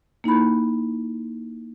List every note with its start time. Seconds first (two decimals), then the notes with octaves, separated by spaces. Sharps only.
0.24 A#3 D#4 E4 B5